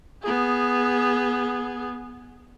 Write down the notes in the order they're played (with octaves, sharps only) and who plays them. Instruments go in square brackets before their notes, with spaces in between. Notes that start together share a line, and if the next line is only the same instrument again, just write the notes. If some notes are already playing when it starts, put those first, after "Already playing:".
[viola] B3 G#4